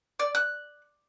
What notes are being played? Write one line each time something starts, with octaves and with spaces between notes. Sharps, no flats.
D5
F#6